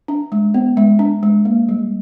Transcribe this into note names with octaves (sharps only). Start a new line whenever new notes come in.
D4
G#3
B3
G#3
D4
G#3
A#3
G3